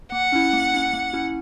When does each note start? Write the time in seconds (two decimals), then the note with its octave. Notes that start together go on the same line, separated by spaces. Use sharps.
0.12 A#3 F#5
0.32 C#4 E4
0.53 A#3
0.74 C#4 E4
0.93 A#3
1.13 C#4 E4